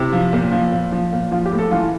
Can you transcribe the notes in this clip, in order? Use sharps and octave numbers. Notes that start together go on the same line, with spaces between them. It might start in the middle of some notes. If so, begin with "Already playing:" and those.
Already playing: C3 E4
F3
A#2
F3
A#2
F3
A#2
F3 F4
G4
A2
A4
E3 F4